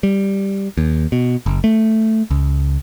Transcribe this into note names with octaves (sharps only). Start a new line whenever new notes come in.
G3
D#2
B2
F#1
A3
C#2